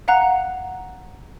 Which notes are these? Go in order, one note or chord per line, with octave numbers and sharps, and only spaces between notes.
F5 F#5 A#5 F#6